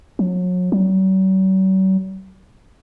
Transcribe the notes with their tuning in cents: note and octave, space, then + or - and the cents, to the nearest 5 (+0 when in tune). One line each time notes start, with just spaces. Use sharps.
F#3 -35
F#3 +45